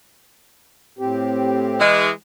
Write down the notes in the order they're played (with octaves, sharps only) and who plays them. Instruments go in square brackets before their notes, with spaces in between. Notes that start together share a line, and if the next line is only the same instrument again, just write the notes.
[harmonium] A2 C4 G4
[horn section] E3 G#3